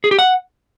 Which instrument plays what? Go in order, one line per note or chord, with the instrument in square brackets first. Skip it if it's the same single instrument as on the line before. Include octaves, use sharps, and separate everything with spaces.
[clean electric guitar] G#4
G4
F#5